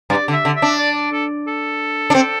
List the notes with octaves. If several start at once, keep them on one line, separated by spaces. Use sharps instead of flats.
G2 D5
D3
E5
D3
E5
D4
D5
A4
A4
D4
C4